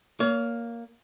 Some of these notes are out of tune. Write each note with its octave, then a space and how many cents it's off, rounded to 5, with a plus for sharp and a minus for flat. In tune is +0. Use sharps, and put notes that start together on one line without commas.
A#3 +0 C#5 +35